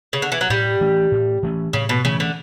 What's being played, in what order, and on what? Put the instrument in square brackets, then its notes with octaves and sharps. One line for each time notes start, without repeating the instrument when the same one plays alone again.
[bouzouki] C#3
D3
E3
F#3
[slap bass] A2 [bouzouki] G3
[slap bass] E3 A3 C#4
A2
E3 A3 C#4
[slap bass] A2 [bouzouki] C#3
[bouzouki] B2
[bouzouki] C#3 [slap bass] E3 A3 C#4
[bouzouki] D3